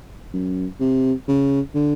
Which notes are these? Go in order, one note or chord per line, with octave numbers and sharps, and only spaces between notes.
F#2
C3
C#3
D3